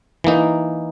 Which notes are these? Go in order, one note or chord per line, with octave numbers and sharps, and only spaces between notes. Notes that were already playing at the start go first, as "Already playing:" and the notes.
E3 A#3 D#4